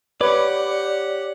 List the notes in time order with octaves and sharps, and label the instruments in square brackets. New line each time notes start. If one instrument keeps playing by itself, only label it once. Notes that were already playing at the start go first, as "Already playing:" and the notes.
[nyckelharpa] G4 F#5 [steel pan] B4 [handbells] C#5 D6 [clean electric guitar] D5